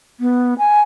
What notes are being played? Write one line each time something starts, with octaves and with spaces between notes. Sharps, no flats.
B3
G#5